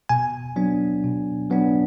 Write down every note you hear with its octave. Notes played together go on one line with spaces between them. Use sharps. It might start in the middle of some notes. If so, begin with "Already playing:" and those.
B2 G#5
F#3 B3 D4
B2
F#3 B3 D4